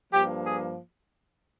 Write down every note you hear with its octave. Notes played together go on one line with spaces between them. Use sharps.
G2 F3 A#3 G4
G#4